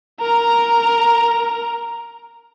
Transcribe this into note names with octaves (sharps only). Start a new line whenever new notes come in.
A#4 A#5